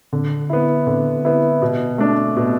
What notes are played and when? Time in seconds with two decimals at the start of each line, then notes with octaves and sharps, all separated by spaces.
0.13 D3
0.50 B3 E4
0.87 D3
1.25 B3 E4
1.62 B2
1.98 A3 D4
2.36 B2